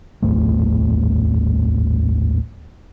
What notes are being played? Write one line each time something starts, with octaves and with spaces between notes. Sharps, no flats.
D#1 A1 F2 A3